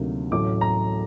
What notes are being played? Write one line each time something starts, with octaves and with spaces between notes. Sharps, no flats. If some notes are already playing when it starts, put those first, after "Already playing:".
Already playing: D2 C3 D#3 F#3 A#3
A1 A2 F#3 A3 D6
A#5